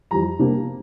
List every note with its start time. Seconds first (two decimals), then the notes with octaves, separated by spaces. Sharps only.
0.11 F2 E3 G3 A#5
0.39 C3 G3 A#3 D4